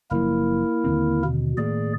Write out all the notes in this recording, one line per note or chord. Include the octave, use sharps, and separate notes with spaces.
F#1 F3 A#3 E4 A#4
D#2 D3 C4
B2
A2 D#3 A#3 G#4 D5